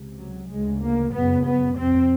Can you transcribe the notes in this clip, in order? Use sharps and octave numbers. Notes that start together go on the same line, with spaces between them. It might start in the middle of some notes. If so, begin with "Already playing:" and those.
Already playing: C#2 C3
F#3
D2 C#3 G#3
A#3
F#2 C#3 B3
B3
F2 C3 C4